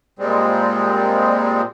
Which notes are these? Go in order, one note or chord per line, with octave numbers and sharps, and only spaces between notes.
A#2 G3 G#3 C4